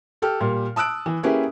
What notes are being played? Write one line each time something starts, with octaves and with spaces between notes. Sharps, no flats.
G4 A4 G5 F6
A#2 G3
A5 D#6 E6 F#6 D7
E3
A#3 C#4 E4 G4 G#4 B4